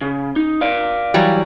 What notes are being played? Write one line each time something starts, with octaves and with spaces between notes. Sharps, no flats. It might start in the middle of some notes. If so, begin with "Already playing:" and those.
C#3
D#4
D5 F5
E3 F#3 G3